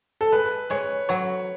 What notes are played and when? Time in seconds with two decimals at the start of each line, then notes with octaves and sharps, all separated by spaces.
0.21 A4
0.32 G#3 B4
0.70 G#3 C#5
1.09 F#3 C#5